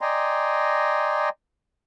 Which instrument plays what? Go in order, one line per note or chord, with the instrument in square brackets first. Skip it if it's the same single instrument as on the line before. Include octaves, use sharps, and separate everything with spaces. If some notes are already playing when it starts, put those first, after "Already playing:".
[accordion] D5 D#5 G5 G#5 A#5 C6